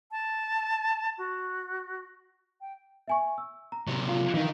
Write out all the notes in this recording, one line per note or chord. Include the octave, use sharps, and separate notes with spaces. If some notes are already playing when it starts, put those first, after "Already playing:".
A5
F#4
G5
E5 G#5 C#6
E6
A#5
C3 F#3
F4
D#3 E3 D#4 F5